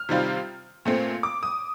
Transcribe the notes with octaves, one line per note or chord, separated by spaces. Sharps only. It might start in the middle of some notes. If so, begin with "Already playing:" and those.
Already playing: F6
C3 D#3 G3 C4 F4
A#2 A3 C4
D6
D#6